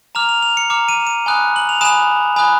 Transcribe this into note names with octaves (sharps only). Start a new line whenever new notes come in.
A#5 D6 F6 F7
F7
F7
C#7
A#5 D6 F6 C#7
D#7
E7
D#7
G#5 B5 D#6 F#6
F#7
F7
G#5 B5 D#6 F#6 E7
G#5 B5 D#6 F#6